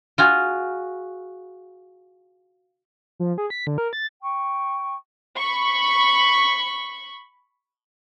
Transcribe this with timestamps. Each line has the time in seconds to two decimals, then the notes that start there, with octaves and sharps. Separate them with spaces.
0.18 F4 F#4 G#4
3.20 F3
3.38 G#4
3.50 B6
3.67 D3
3.78 A#4
3.93 A6
4.21 G5 C#6
5.38 B5 C#6